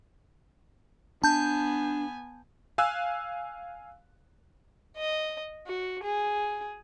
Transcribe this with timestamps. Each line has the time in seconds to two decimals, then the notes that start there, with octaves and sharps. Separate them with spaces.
1.23 B3 D4 G#5 A5 G6
2.78 F5 G#5 E6 F#6
4.97 D#5
5.67 F#4
6.03 G#4